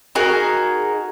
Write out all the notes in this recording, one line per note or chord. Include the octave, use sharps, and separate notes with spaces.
D#4 F#4 G#4 A#4